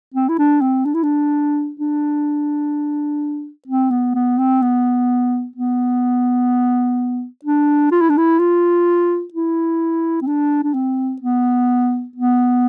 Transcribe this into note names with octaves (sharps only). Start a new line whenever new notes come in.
C4
E4
D4
C4
D4
E4
D4
D4
C4
B3
B3
C4
B3
B3
D4
F4
E4
D4
E4
F4
E4
C4
D4
D4
C4
B3
B3